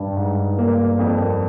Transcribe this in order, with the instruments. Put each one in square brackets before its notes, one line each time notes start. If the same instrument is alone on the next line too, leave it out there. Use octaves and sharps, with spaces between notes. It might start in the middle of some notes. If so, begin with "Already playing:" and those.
Already playing: [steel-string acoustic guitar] G2
[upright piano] G#2
A#3
F2